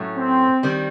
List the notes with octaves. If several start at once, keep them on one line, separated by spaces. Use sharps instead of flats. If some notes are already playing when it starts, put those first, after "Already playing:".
Already playing: A2 F#3 A3 C#4
C4
D#3 G3 C4